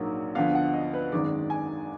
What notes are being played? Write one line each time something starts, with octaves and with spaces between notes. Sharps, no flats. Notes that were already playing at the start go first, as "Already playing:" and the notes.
Already playing: A#1 G#2 F#3 A#3
D2 D3 F3 B3 F5
F#5
D#5
B4
G#1 F#2 D#3 G#3 D5
G#5